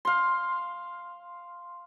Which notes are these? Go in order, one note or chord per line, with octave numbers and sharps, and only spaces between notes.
F5 C6